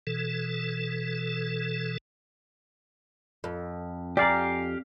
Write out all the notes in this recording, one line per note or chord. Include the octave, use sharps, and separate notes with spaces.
B2 E3 A4
F2
G4 D5 F5 G#5 A#5